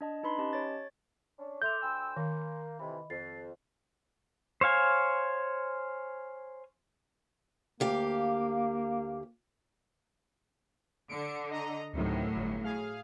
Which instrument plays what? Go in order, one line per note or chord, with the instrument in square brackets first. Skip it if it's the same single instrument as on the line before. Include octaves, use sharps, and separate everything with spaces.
[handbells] D4 D#5 A5
D#4 B4 B5 C6
C#4 G4 D#5 A5
C#5 A6
[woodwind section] C#4 D4
[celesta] A4 C6 F7 [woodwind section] E5 D6 [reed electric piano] G6
[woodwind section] D2 G5 E6 [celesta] G#5 B5 C6
[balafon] D#3 [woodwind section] A#3
[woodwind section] F2 C3 E3 [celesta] D#5 B5
[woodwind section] F2 [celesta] A6 C7
[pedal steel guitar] C5 C#5 F5 G#5
[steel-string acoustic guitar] D2 G4 F5 [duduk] A#3
[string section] D3 [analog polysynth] C#7 D7
[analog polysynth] D#5 A#5
[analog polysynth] D2 C3 D#3 [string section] A2 F#3
[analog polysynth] G1
G#4 F5